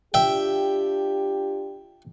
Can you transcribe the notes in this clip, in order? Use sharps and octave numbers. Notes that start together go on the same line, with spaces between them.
D4 F4 G4 E5 G5